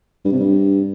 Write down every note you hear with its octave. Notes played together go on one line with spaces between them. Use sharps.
G2
C3
G2